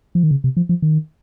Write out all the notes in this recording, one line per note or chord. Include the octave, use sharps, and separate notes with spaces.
F3
D#3
C#3
C3
F3
F3
D#3